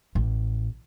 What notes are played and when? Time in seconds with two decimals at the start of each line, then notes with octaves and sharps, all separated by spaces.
0.15 A1